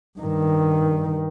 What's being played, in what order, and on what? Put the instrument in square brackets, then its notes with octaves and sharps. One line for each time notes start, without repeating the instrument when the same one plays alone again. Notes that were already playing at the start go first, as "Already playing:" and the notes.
[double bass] G2 D#3